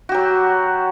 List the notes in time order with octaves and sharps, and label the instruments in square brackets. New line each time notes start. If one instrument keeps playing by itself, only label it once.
[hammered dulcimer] F#4
G4
F#3